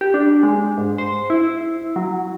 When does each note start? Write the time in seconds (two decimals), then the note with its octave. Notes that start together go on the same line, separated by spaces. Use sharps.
0.01 G4
0.14 D4
0.43 G#3
0.78 G#2
0.98 C5
1.30 E4
1.96 F#3